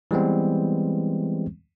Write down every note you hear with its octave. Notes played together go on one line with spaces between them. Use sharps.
E3 G3 G#3 B3 C4